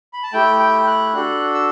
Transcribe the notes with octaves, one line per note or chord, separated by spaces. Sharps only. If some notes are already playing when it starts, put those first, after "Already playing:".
B5
A5
A3 E4 G4 G5
G5
F#6
D4 F#4 A4 F#6
E6